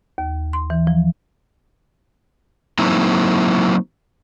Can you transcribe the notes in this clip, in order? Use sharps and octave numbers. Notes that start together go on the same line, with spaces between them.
D#2
C6
E3
F3
F#3 A#3 C4 D#4 E4